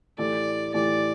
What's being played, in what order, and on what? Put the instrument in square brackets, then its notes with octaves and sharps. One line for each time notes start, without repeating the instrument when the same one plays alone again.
[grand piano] A2 E3 A3 E4 G4 [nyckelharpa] D5
[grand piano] A2 E3 A3 E4 G4 [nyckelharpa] D5